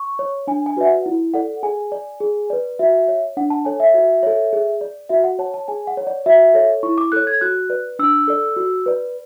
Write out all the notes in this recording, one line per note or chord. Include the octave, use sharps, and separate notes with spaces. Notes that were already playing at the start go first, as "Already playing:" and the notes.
Already playing: C#6
C#5
D4 G#5
G#5
F#4 B4 D5 E5
F#5
E4
A4 D5 F#5
G#4 G#5
D5
G#4
B4 D5
F#4 E5
C#5
D4 F#5
A5
A4 C#5 G#5
E5
F#4
A4 C#5
G#4
D5
F#4 E5
F#5
C#5 A5
A5
G#4 G#5
F#5
C#5
D5
F#4 E5
A4 C#5
E4 C#6
D6
A4 C#5 F#6
G#6
F#4 F#6
B4 D5
D4 E6
A4 D5
F#4
B4 D5